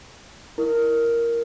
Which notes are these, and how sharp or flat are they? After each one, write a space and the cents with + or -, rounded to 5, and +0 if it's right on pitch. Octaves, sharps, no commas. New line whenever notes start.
E4 +0 A#4 +0